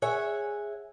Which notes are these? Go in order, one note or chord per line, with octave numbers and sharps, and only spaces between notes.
G#4 C#5 E5 F#5 G#5